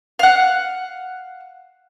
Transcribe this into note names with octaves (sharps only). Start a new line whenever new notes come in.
F5 F#5